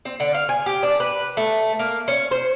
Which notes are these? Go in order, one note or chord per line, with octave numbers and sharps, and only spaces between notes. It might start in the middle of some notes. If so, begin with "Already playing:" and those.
C4
D3
F5
G#5
G4
D4
B4
A3
A#3
C#4
C5